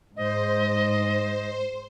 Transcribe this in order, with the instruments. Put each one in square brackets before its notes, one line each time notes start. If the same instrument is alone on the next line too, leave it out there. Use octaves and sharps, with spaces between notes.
[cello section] G#2 [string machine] C5 [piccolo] D#5